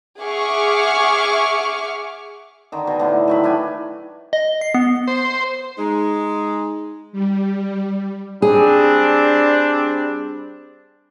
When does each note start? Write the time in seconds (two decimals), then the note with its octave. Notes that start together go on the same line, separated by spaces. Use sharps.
0.21 G#4 E5 F#5 C#6 D6 F6
2.72 D3 D#3
2.87 B2
3.00 A2 D3
3.28 D#3 F#3 B5
3.44 A2 D4 E4 G#5
4.33 D#5
4.61 C7
4.74 B3
5.07 C5
5.78 G#3 D#4
7.12 G3
8.42 G3 C4 D4 G#4